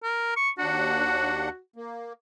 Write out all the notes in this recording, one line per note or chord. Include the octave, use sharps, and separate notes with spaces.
A#4
C#6
D#2 D4 F#4 F#5
A#3